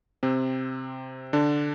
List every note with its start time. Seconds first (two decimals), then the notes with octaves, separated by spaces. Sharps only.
0.23 C3 C4
1.33 D3 D4